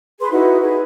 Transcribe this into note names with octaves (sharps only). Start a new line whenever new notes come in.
G#4 B4 C6
D#4 E4 F#4 B4
G#4 B4